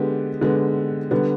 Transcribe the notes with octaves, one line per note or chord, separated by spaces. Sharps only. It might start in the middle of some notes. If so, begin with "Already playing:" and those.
Already playing: D3 G#3 B3 G4
D3 G#3 B3
D3 G3 B3